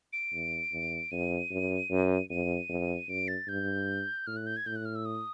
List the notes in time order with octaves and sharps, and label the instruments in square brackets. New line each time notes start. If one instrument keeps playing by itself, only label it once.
[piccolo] D7
[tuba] E2
E2
[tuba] F2 [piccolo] D#7
[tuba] F#2
F#2
[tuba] F2 [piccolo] D#7
[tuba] F2
[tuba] F#2 [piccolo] D7
[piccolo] A6
[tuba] G2 [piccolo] G6
[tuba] A2 [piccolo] F6
[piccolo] F#6
G6
G#6
[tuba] A2 [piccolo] G6
[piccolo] F#6
F6
E6
D#6